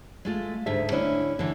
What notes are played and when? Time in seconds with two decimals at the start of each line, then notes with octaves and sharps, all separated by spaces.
0.25 G#3 A3 F4
0.66 D2 G#2 A4 E5
0.91 D3 C#4 D4 E4
1.39 D3 E3